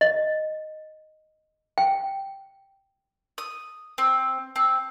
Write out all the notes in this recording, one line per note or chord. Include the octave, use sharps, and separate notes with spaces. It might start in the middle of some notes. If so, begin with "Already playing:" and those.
D#5
G5
D#6
C4
C4